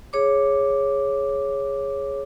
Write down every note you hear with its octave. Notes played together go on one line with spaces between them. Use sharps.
G#4 C#5 D6